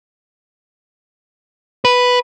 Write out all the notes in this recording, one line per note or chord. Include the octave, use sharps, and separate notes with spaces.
B4